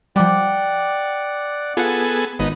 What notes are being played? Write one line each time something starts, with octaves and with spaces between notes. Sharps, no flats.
F3 G3 D5 F#5 G5 D6
B3 F4 G#4 A4 F#5
G#1 B3 D#4